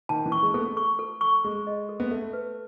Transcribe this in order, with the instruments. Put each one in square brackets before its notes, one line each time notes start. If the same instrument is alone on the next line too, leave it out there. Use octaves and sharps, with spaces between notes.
[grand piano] D#3 [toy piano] A5
[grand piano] E3
[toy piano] C#6
[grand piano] G#3
[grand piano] B3 [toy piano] A4
[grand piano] A3
[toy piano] C#6
A4
C#6
[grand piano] G#3 [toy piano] C#6
[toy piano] D#5
A4
[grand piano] B3
[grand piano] A3 [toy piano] E5
[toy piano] B4